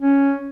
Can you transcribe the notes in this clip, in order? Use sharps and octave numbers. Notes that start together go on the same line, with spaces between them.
C#4